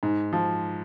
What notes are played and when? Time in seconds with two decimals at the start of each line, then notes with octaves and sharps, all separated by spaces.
0.03 G#2
0.33 F3